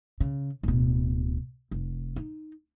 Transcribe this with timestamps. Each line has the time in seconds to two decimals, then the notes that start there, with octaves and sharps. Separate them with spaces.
0.20 C#3
0.63 D1 B2
1.71 F1
2.16 D#4